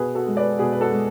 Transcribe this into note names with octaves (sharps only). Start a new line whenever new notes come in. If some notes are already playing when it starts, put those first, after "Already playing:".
Already playing: B2 G#4 B4
F#4 A4
G#3
B4 D5
B2 G#4 B4
B4
F#4 A4
G#3